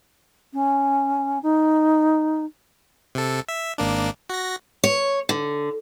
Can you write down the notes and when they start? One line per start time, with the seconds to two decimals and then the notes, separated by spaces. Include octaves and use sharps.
0.53 C#4
1.43 D#4
3.15 C3 A4
3.49 E5
3.78 G#1 A#3 D4
4.29 F#4 A#6
4.84 C#5
5.29 D3